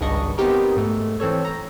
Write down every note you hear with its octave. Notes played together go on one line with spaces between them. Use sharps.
G#1 C#2 G2 D4 D#5 C#6
B3 C4 D#4 G4 A#4
G#2 A3
E3 C4 A4 C#5
A#5